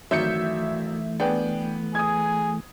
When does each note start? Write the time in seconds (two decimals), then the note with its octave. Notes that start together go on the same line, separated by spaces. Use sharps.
0.11 G#1 E3 F#3 A3 E5 G6 C#7
1.20 B3 D4 G#4 G5
1.95 G#4 D#6 G#6